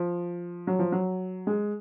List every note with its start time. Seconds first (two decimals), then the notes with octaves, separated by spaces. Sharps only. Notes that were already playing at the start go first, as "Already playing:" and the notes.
Already playing: F3
0.67 F#3
0.79 F3
0.92 F#3
1.47 G#3